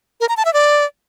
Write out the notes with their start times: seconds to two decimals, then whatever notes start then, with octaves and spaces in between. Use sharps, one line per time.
0.21 A#4
0.29 A#5
0.37 A5
0.45 E5
0.53 D5